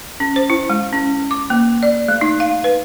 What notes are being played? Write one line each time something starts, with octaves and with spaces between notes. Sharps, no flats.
C#4
C5
E4
G#3
C#4
D6
A#3
D5
A3
D#4
F5
B4